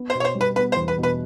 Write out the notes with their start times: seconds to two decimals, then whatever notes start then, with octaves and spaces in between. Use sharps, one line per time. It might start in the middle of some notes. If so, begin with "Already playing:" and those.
Already playing: B3
0.10 C5
0.15 B2
0.20 C#5
0.25 C5
0.35 G3
0.41 B4
0.56 B3 B4
0.72 C5
0.76 E2
0.88 B4
0.98 B2
1.03 B4